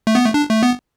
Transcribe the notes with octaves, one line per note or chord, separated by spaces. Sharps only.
A3
B3
A3
D4
A3
B3